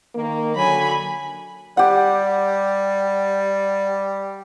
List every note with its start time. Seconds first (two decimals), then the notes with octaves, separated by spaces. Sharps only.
0.15 D#3 A#3
0.56 D3 F#3 G#5 B5
1.77 G3 G4 F#5